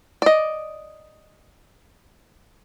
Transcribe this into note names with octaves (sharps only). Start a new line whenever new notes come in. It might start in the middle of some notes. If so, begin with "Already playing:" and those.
D5 D#5